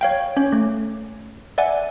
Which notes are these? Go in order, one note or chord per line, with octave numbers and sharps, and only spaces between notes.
C#5 F5 G5
C#4 C#5
A3
D5 E5 F#5 G#5